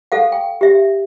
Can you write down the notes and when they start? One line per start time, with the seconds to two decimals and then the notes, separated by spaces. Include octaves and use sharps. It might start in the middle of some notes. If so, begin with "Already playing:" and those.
0.12 A4 F5 F#5
0.32 G5
0.61 G4 E5